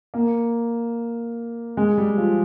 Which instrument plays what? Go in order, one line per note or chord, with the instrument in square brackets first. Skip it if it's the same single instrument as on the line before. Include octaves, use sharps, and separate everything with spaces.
[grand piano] A#3
G#3
G3
F3